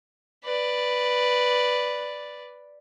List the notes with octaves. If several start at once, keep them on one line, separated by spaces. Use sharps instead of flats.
B4 D5